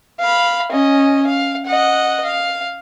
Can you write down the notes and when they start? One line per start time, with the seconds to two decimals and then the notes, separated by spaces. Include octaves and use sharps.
0.20 F5 B5
0.72 C#4 D#5
1.27 F5
1.66 D#5 F#5
2.25 F5